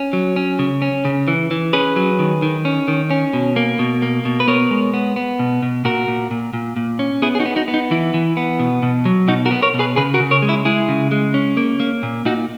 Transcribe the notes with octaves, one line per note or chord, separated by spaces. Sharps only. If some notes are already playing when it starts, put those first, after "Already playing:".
Already playing: C#4
F#3
C#4
C#3
C#4
C#3
E3
E3
C#4 G#4 B4
F#3
D#3
D#3
C#4
D#3
C#4
B2
A#3
B2
A#3
B2
B4
B3 A#4 C#5
G#3
B3
B3
B2
B2
A#2 F#4 A#4
A#2
A#2
A#2
A#2
C#4
B3 E4 G#4
G#4
D#4 F#4
B3
D#4 F#4
B3
D#4
E3 E4
E3
B3
B2
B2
F#3
B2 D#4 F#4
F#4 A#4
B3
A#4 C#5
B2
G#4 B4
C#3 G#4 B4
F#4 A#4
C#3
A#4 C#5
G#3
E4
G#3 E4 G#4
C#3
G#3
C#4
A#3
A#3
A#2
A#2 D#4 F#4